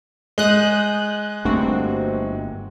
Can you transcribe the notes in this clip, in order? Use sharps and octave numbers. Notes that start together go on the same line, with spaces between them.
G#3 D#6 F#6 G6
G1 G2 A3 A#3 C4 F#4